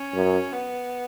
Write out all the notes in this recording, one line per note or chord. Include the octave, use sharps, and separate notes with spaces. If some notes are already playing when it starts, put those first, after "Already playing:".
Already playing: C#4
F#2
B3